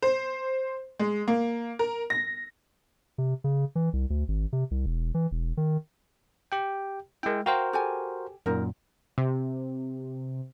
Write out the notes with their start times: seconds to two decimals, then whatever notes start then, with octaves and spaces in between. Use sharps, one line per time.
0.02 C5
1.00 G#3
1.28 A#3
1.79 A#4
2.10 A#6
3.18 C3
3.44 C#3
3.75 E3
3.93 C2
4.10 D2
4.28 G#1
4.53 C3
4.71 C2
4.86 E1
5.14 E3
5.31 E1
5.57 D#3
6.52 G4 G5
7.23 G#3 E4 A#4 G5
7.46 F#4 A#4 C5 F5 G5 A#5
7.73 G4 A4 G#5
8.46 F#2 A#2 D#4 A#4
9.18 C3